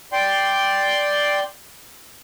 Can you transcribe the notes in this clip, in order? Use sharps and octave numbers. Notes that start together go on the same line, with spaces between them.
D5 G5 C6